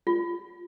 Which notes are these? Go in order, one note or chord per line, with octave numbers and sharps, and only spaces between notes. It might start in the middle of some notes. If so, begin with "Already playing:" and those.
F4